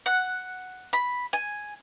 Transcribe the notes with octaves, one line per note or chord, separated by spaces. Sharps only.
F#5
B5
G#5